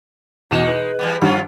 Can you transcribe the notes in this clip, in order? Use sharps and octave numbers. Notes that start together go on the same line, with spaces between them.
E2 B2 G#3 C#4 D#4 E7
B4 F#7
E3 G3 B3
G2 D#3 F3 G3 C#4 F4 F#5